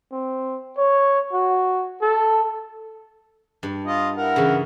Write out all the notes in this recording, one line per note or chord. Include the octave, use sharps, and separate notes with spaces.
C4
C#5
F#4
A4
G2
F4 D#5
E4 A#4 F#5
C#3 E3